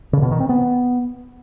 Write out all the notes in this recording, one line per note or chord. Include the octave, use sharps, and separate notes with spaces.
C#3
B2
D#3
C4
B3